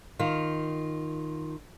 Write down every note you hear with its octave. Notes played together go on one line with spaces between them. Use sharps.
D#3 F4